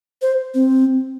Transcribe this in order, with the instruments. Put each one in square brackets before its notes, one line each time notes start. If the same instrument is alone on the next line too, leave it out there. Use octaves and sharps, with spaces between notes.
[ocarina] C5
C4